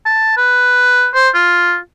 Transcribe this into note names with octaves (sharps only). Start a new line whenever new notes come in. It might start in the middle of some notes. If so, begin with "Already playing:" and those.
A5
B4
C5
F4